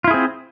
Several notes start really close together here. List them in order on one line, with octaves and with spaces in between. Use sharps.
F4 E4 G#4 C4